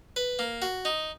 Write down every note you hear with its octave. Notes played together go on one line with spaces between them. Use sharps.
B4
A#3
F#4
D#4